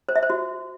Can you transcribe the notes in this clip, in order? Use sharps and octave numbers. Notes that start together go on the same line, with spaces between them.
C5
E5
C5
F#4